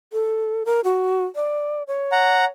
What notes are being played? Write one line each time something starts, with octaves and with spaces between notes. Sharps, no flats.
A4
A#4
F#4
D5
C#5
F#5 A#5